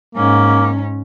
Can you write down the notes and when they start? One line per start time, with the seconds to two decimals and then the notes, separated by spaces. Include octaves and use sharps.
0.16 G#2 A#3 C#4